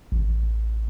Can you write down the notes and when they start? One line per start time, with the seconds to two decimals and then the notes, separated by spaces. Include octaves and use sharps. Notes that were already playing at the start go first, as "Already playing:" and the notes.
0.12 A1